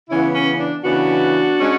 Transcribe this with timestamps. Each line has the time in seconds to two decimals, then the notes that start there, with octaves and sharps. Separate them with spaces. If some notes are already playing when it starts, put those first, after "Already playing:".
0.10 C#3 E3 B3 C#4 E4
0.35 C#4
0.59 D4
0.84 C#3 E3 B3 D4 F#4
1.59 G#3 C#4